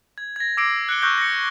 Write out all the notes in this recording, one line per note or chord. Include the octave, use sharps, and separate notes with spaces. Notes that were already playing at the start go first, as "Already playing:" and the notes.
G#6
G#6 A#6
D6 E6 A#6 C7 D7
F#6 C#7 D7 G7
C#6 E6 F#6 G6 A#6 D7
A#6 C#7